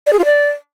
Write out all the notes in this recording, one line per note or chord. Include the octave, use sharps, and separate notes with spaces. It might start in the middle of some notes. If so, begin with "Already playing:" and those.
D5
G#4
F4
D5